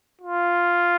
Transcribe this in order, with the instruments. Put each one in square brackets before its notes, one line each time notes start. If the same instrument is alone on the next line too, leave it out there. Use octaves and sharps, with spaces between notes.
[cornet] F4